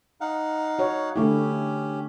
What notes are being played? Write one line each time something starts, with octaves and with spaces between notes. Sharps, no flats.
D#4 F5 F#5
F#4 C#5
D3 A3 C#4 E4 G4